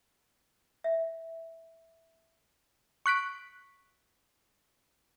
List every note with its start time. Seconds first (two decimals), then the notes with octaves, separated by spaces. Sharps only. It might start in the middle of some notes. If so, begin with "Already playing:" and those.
0.84 E5
3.06 C#6 F#6 B6 D7